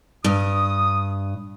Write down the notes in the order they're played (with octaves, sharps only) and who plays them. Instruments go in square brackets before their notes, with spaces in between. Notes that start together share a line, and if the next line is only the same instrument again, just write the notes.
[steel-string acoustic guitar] G2 [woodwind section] D#6